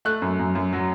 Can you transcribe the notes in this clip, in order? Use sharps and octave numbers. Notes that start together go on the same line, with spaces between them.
A3 F#6
F#2
F#2
F#2
F#3